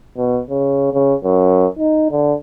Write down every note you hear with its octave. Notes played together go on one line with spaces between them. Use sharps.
B2
C#3
C#3
F#2
D#4
D3